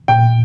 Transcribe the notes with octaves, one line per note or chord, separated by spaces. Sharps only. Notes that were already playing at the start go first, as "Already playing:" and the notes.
A#2 G5